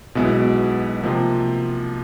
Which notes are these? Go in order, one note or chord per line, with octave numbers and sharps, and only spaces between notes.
B1 B2 G#3 B3 E4
C3 F3 A#3